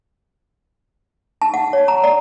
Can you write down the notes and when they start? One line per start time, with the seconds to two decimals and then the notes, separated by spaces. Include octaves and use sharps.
1.42 A5
1.54 F#5
1.73 C#5
1.88 A#5
2.04 D5